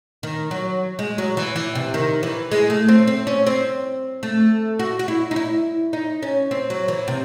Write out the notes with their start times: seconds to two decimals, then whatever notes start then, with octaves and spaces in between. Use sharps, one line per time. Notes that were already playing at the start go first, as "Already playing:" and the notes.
0.23 D#3
0.51 F#3
0.99 G#3
1.18 F#3
1.37 E3
1.56 E3
1.75 C3
1.94 D#3
2.23 E3
2.52 G#3
2.70 A3
2.88 C4
3.07 C4
3.27 C#4
3.47 C4
4.23 A3
4.79 F#4
4.99 F#4
5.08 E4
5.31 D#4
5.36 E4
5.93 D#4
6.23 C#4
6.51 C4
6.70 F#3
6.88 E3
7.08 C3